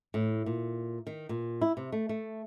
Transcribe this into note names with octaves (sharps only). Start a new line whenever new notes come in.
A2
A#2
D#3
A#2
E4
C3
A3
A3